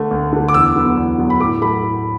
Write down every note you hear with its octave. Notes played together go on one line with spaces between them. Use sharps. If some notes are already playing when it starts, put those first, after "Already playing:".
Already playing: D3 A3
D2
D3 A3
D6
E2 E6
D3 F#3 B3
E2
D3 F#3 B3
B5
A2 D6
F#3 A3 B5
A2